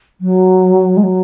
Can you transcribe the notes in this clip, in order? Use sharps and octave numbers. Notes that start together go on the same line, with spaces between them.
F#3
G#3
F#3